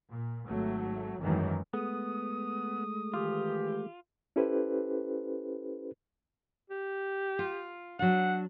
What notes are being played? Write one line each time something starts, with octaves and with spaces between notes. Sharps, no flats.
A#2
G#1 F#3 A3
G#1 F#2 D#3 E3 A3
G#3 A3 B3 D#6
D#3 E3 F4 G4
C#4 E4 G4 A4 B4 C5
G4
F4
F#3 D4 F#5